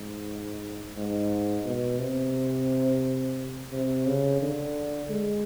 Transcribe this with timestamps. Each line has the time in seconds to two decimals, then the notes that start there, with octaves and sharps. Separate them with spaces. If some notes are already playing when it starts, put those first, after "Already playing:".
Already playing: G#2
0.96 G#2
1.66 B2
2.00 C3
3.72 C3
4.07 C#3
4.42 D3
5.10 G#3